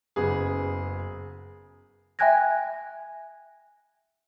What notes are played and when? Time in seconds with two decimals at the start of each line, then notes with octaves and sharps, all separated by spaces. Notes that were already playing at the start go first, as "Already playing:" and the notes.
0.16 F#1 C#3 B3 G#4
2.19 E5 G5 G#5 F#6 G#6 A#6